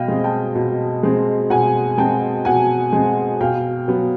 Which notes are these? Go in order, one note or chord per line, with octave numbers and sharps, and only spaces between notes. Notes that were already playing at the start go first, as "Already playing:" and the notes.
Already playing: B2 D#5 F5 G5
G#3 C4
G5 A5
B2
G#3 C4
B2 F#5 G#5
G#3 C4 G5 A5
B2 F#5 G#5
G#3 C4
B2 F5 G5
F#3 B3